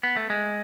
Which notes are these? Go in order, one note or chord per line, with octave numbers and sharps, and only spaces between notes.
B3
A3
G#3